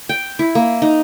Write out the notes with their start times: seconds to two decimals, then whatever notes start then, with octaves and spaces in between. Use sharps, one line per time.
0.09 G5
0.39 E4
0.55 A#3
0.82 D#4